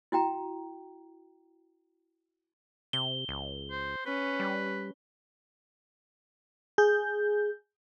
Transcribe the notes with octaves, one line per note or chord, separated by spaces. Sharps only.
E4 F#4 G5 A#5
C3 G7
C#2
C5
C#4 B4
G3
G#4 G6